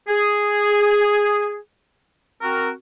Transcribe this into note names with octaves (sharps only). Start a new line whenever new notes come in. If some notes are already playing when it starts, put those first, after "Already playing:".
G#4
C4 F#4 A#4